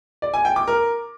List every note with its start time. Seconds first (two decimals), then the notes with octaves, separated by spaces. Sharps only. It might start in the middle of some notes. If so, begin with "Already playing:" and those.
0.22 D5
0.34 G#5
0.45 G5
0.56 D6
0.68 A#4